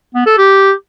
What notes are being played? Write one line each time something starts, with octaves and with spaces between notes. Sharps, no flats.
B3
A4
G4